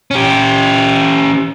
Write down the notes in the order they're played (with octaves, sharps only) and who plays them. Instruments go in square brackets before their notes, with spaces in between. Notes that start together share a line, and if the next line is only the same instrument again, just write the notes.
[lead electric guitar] C#4 G4